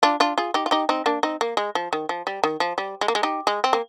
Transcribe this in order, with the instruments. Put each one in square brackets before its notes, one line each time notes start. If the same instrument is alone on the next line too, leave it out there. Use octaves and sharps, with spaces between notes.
[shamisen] D4 F4
D4 F4
F4 G#4
D#4 G4
F4
D#4 G4
C4 D#4
A#3 D4
C4 D#4
A#3
G#3
F3
D#3
F3
G3
D#3
F3
G3
G#3
A#3
G#3
D#4 G4
G#3
C4
A#3